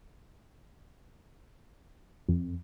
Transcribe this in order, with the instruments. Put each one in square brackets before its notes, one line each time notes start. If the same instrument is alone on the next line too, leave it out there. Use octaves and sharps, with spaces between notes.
[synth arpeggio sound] F2